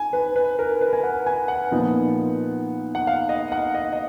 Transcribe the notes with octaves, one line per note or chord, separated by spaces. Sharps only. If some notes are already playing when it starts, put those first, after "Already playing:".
Already playing: G#5
B4
B4
A#4
B4
G#5
F#5
G#5
F#5
A#2 F3 B3 D#4
F#5
F5
D#5
F#5
D#5
D#5